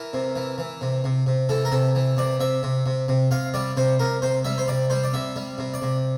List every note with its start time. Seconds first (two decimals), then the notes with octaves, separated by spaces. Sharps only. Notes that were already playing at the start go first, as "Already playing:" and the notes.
Already playing: E3 A#4
0.13 C3
0.35 E3
0.58 E3
0.81 C3
1.04 C3
1.26 C3
1.49 E3 A4
1.65 A#4
1.72 C3 A4
1.95 E3
2.17 C3 D5
2.40 C3 E5
2.63 C3
2.86 C3
3.08 C3
3.31 C3 F5
3.54 G3 D5
3.77 C3 C5
3.99 C3 A#4
4.22 C3 C5
4.45 G3 E5
4.58 C5
4.68 C3 D5
4.90 G3 C5
5.03 D5
5.13 C3 E5
5.36 G3
5.58 C3
5.74 D5
5.82 C3